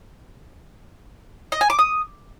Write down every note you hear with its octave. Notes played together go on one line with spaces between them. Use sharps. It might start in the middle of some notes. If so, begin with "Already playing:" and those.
D#5
G#5
D6
D#6